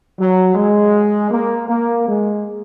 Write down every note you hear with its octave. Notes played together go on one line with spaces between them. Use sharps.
F#3
G#3
A#3
A#3
G#3